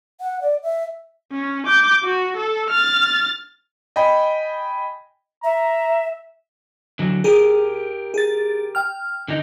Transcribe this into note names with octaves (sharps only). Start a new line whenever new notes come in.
F#5
D5
E5
C#4
D6 G6
F#4
A4
F6 A6
D#5 G5 G#5 B5
E5 A#5
D3 F#3
G4 G#4 A#4
G#4 A6
G5 F6
D3 D#4